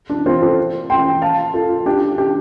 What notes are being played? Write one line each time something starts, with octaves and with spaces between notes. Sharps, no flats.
D4
C4 F4
F4 A4
G5 C6
F5 A5
F4 A4
D4 G4
D4 G4